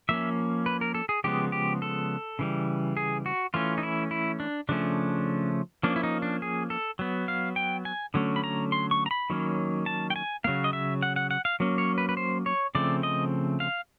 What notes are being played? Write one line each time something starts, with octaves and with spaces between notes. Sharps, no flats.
F3 A#3 C#4 E5
B4
A#4
A4
G#4
C#3 F3 G#3 B3 G4
G4
A4
C#3 E3 G3
G#4
F#4
E3 A3 C#4 F4
D#4
E4
E4
D4
C#3 F3 A3 C#4 D4
F3 A#3 C#4 D4
E4
D#4
D4
G#4
A4
F#3 B3
F5
G5
G#5
D3 F#3 A3 C#4
B5
A#5
C6
C#6
A#5
B5
D#3 F#3 A#3 C#4
A5
G5
G#5
C#3 F#3 A#3 F5
D#5
E5
F#5
F#5
F#5
F5
F#3 A#3 C#4
C#5
B4
B4
C5
C#5
C#3 F3 A3 C4 D5
D#5
F5